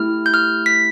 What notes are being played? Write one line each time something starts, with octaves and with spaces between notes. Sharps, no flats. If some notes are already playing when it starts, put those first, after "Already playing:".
Already playing: A3 E4 G4 F6
G6
F6
B6